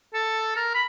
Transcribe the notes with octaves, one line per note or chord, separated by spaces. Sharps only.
A4
A#4
B5